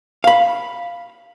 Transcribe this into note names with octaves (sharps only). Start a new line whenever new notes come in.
F5 B5